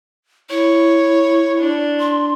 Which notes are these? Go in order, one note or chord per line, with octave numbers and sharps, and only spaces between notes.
E4 C#5
D4
C6